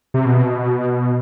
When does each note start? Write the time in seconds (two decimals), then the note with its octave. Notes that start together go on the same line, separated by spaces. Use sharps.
0.14 C3
0.25 B2